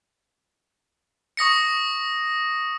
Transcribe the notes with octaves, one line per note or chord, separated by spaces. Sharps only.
C#6 D#6 A#6 C#7